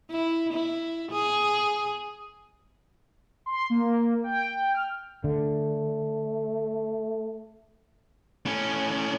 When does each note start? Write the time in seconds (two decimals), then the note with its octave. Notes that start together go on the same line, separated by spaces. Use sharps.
0.11 E4
0.53 E4
1.11 G#4
3.46 C6
3.70 A#3
4.24 G5
4.74 F6
5.24 D3 A3
8.46 A2 C#4